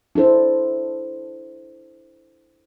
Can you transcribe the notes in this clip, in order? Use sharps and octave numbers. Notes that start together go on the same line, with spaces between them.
D4 E4 A4 C5